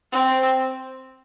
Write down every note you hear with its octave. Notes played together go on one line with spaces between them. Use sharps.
C4